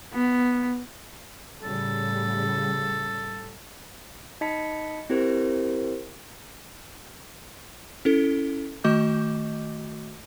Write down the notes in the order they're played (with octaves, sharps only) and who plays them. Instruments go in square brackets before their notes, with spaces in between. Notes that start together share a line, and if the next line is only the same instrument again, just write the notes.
[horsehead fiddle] B3
[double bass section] A2 C#3 G3 [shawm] A4
[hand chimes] D#4 D#5 A5 B5 B6 C#7
C4 E4 G4 A#4 C5
[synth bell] C#4 E4 A4
D#3 A3 F#4 D#5 D6 G6